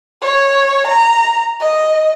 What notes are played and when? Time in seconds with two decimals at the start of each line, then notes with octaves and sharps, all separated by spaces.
0.22 C#5
0.87 A#5
1.60 D#5